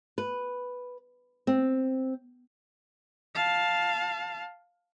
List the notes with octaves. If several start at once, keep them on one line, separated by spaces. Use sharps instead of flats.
B4
C4
F5 A5